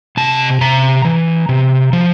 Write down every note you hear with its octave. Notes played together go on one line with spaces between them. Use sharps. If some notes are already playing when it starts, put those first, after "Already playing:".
C3 A5
C3 A#5
E3
C3
F3